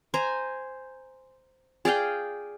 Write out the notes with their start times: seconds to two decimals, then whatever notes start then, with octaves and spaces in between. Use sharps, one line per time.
0.14 C5 G#5 A#5
1.85 G#4 D5 F5 G5